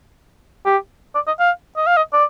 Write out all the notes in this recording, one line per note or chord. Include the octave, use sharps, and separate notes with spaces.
G4
D5
D#5
F5
D#5
F5
D#5
D5